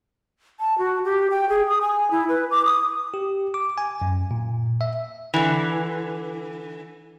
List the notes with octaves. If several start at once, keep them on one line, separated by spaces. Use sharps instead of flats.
A5
F#4
G4
G5
G#4
D#6
G#5
E4
B4
D6
D#6
G4
D6
G#5
F#2
A#2
E5
D3 E3